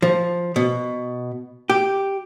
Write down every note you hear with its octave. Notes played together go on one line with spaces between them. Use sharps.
F3
B2
G4